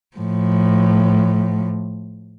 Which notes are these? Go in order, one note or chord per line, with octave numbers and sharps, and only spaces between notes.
A2 F3